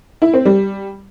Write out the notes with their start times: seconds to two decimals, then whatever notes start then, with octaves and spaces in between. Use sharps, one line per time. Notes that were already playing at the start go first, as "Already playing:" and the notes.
0.22 E4
0.34 C4
0.45 G3